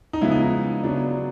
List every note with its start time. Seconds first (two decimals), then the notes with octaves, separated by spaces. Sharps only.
0.13 D#4
0.21 C#3 F3 G#3 B3 E4
0.31 D#4
0.42 D#4
0.83 C#3 F#3 B3 D4